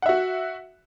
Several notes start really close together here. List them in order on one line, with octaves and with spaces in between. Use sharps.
F#5 E5 F#4